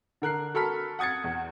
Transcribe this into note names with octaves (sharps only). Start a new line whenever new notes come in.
D3 A#4 F#6 C7
F#4 A4 A#4 B5 F6 B6
F#5 D#6 G#6 A6 C#7
E2